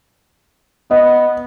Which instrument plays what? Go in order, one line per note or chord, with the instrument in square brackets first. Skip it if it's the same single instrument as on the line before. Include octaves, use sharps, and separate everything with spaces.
[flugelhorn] B3 [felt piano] D#5